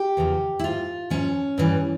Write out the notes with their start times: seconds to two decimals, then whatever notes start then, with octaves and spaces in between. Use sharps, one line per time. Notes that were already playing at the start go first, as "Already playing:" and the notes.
Already playing: G4
0.17 E2 C#3 F3
0.59 E4
0.64 G#2 F3 F4
1.10 G#2 F3 C#4
1.58 G2 E3 G3